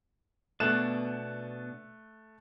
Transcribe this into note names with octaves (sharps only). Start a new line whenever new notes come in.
B2 A3 B3 D4 F#6 E7